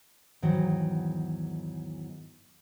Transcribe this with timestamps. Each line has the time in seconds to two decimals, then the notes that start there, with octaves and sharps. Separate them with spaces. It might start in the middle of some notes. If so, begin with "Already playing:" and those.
0.42 E2 G#2 D#3 E3 F#3